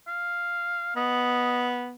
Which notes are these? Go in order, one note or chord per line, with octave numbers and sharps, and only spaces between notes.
F5
B3 D#5